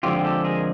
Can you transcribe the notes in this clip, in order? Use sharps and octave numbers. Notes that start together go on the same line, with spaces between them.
D3 F3 G#3 C4 F4 G4
G4 A4
G#4 A#4